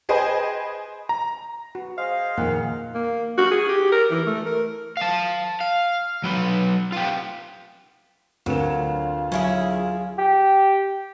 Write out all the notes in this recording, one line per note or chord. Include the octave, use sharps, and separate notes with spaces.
G#4 B4 C5 D#5 G5 G#5
A#5
B3 F#4
G#4 C5 D#5 F5
F2 A#2 D#3 A#3 F#5
A#3
F#4
G#4
G4
A#4
E3
A3
A#4
F5 A5
F5
F#3 B4
F4 G4
D2 F#3 C4 F4 A#4 B4 E7
F#3 C#4 E4 G#4
G4